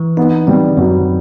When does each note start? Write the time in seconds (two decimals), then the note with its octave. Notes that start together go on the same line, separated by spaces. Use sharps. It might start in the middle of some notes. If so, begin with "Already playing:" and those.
Already playing: E3
0.17 B3 D#4
0.47 G3 C4
0.77 F#2 F#3